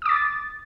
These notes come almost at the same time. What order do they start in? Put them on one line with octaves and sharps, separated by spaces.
D#6 D6 A6